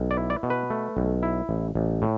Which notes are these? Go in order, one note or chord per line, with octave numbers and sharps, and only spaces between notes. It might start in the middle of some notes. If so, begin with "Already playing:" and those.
Already playing: B1
D5
E4
D5
B2
B4
A3
B1
E4
A1
A1
A2